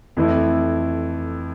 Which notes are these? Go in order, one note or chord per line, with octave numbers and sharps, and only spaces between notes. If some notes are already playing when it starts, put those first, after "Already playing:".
F2 E3 A3 E4